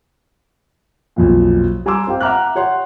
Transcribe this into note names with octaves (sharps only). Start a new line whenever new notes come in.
B1 F2 A#2
G3 G#5 A#5 C6 D6 E6
C4 G4 F5 G5
E5 F#5 A#5 D6 F6 F#6
G4 C#5 F#5 C6